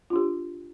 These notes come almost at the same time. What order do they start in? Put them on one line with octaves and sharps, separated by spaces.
F4 D4 G4